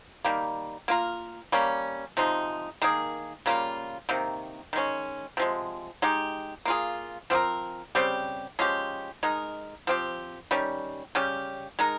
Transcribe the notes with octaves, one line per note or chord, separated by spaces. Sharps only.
D#3 G3 A#3
A#3 F4 A#4
G3 A#3 C#4
C3 F3 G#3 D#4
D#3 A#3 F4 G#4
C#3 G3 A#3 F4
C3 D#3 A#3
D#3 G#3 C#4
C3 F3 G#3
G#3 D#4 G4
A#3 F4 G#4
F3 C4 G4 A#4
C#3 G3 C4 G4
F3 G#3 C#4 G4
G#3 D#4 A#4
F3 C4 G4
D#3 G3 C#4
C#3 G3 C#4 G4
G#3 D#4 A#4